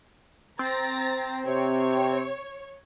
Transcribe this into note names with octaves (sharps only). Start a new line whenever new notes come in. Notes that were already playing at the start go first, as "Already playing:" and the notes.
C4 A#5 A6 A#6
C3 C#5